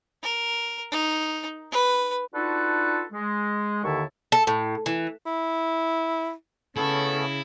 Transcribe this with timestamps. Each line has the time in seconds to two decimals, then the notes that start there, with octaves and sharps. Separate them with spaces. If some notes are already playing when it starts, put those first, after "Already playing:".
0.23 A#4
0.92 D#4
1.71 B4
2.33 D4 D#4 F4 F#4 A4 B4
3.13 G#3
3.84 D#2 D3 D#3 E4 A5 C#6
4.32 A4
4.47 A2
4.86 E3
5.26 E4
6.77 C#3 A3 B3 C#4 E4 A4